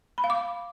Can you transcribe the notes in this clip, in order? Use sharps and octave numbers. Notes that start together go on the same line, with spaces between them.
B5
F5
D6